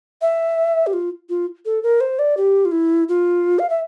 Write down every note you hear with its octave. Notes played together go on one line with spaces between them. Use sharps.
E5
G4
F4
F4
A4
A#4
C5
D5
G4
F4
E4
F4
F5
E5